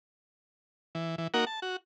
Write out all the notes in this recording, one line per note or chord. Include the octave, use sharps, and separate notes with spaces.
E3
E3
A#3 D#4 F#4 A#4 F#5
A5
F#4